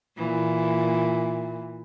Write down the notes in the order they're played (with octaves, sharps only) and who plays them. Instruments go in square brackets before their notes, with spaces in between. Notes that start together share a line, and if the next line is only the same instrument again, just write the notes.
[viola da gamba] A#2 E3